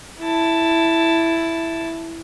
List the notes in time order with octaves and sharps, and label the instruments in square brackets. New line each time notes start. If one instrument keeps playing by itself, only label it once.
[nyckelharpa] E4 A5